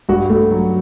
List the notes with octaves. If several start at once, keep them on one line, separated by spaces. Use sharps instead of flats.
G2 F#4
A3
F#3